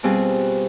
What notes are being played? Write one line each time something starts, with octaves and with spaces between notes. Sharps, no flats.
B2 G3 C4 F4 G#4